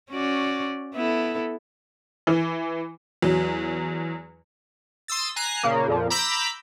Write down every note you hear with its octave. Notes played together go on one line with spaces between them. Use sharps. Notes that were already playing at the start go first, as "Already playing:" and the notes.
C#4 F#4 D5
B3 E4 A4
E3
E2 F#3
C6 D#6 E6 A6
G#5 A#5 F#6 C7
A#2 C#3 A#3
F2 A#2 F3
A#5 B5 D6 E6 G6 B6